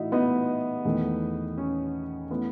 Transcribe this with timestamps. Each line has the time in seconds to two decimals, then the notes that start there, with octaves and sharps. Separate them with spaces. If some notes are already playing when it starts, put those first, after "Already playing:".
Already playing: A2 E3 A3 D#4 F#4 E5
0.12 B3 D#4
0.85 E2 D#3 A3
1.57 C#4
2.30 E3 A3 B3